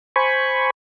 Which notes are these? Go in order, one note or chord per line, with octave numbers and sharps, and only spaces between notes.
C5 G#5 B5 C#6